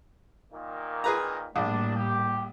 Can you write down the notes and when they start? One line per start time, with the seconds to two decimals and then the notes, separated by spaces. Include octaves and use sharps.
0.51 A#2 D#3 A#3
1.04 G#4 B4 A#5
1.56 A#1 A2 G3 A#3 D4
1.96 G4